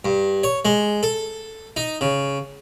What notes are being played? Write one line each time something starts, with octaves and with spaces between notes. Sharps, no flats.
G2
C#5
G#3
A4
D#4
C#3